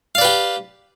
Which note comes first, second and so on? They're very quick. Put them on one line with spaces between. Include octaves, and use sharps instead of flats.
F5 D5 B4 G4